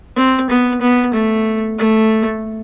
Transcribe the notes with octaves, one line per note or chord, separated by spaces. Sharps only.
C4
B3
B3
A3
A3